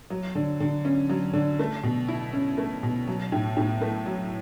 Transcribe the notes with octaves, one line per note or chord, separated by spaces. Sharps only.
F#3
D3
D3
C#4
F#3
D3
A3
B2
E4
C#4
A3
B2
F#3
A2
A2
A3
F#3